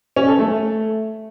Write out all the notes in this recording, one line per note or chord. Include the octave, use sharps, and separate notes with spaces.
C#4
A4
A3